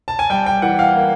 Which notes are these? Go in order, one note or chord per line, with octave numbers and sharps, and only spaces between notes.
A5
G#5
G3 G5
G5
E3 F#5
F5
A#3